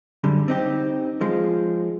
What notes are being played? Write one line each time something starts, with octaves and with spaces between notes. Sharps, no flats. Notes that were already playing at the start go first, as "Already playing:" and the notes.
F#2 D3 G3
C4 D#4 G4
F3 G#3